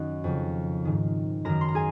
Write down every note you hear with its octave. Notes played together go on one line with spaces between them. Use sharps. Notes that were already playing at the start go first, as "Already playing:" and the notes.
Already playing: F#2 D#3 C#4 D#4 F#4 F#5
F2 C#3
G#2 D#3
F#2 D#3 A#4 A#5
C6
A#5
G#4 G#5